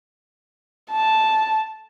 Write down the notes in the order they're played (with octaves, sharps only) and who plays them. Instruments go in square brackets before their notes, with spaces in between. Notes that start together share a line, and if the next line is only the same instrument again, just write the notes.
[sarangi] A5